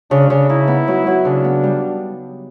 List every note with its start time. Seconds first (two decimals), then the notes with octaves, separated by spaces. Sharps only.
0.10 C#3 D4
0.30 C#3
0.49 D#4 E4
0.68 B3
0.88 F#3
1.07 F#3
1.25 C#3 D4
1.44 B3
1.63 G3